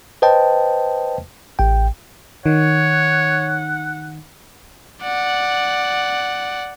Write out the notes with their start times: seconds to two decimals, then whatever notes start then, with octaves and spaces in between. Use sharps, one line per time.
0.22 B4 C5 D#5 G5 A5
1.59 A1 G5
2.46 D#3 C#5 F#5
5.03 D5 F#5